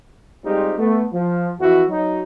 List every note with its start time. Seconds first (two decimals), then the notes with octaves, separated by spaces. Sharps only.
0.45 G3 G#3 C4 D#4 F4 G4
0.79 A3 B3
1.13 F3
1.60 F2 E3 E4 F#4
1.89 F#3 D#4